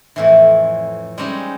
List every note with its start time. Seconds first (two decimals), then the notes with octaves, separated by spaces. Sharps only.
0.16 F2 A2 E3
1.18 G3 G#3 C4 C#4 D#4 G4